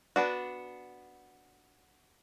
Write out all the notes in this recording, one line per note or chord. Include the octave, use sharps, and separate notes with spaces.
B3 D4 F#4